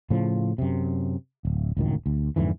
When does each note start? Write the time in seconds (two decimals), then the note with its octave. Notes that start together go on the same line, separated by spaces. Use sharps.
0.10 A2 C#3 F3
0.58 F#2 C3
1.45 D1
1.77 D1 C#2 F#2 D#3
2.06 D2
2.36 F2 G#2 D3 E3